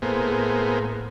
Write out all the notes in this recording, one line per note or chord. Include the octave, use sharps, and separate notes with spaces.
A2 A#3 B3 G#4 C5